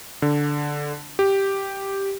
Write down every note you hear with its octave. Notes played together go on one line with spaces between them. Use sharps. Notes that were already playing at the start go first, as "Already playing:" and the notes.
D3
G4